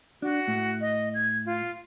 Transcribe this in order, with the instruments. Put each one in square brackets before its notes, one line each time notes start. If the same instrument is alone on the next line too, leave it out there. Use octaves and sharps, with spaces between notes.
[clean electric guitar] D4 [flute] F#4
[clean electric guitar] A2
[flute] D#5
G#6
F4